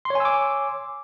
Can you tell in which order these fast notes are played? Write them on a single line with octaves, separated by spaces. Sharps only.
C6 C#5 G#5 E6 D6